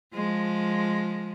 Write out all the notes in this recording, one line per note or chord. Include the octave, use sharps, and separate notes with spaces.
F3 G#3